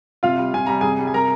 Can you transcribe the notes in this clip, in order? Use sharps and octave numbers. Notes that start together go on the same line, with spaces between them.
C3 F4 F5
G3
C3 G#5
G3 A#5
C3 G#4 G#5
G3
G#5
C3 A#4 A#5